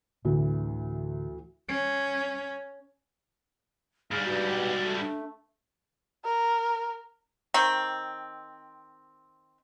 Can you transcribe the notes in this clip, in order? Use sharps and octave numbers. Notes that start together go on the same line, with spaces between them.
D2 A2 D3 E3
C#4
G#2 G3 G#4 F5
G2 F#4
B2 G4
A3
D4
A#4
D#3 C4